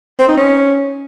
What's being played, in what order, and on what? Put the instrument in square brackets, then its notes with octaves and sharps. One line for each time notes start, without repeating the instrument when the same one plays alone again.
[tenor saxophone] C4
D#4
C#4